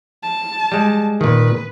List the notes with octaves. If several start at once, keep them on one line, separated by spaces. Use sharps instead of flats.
A5
G3 G#3
A#2 D#3 B4